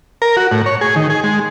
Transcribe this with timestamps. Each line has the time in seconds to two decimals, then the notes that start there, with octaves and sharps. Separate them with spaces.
0.22 A#4
0.37 F#4
0.52 A2
0.66 C#5
0.81 G#4
0.96 D#3
1.10 G#4
1.24 G#3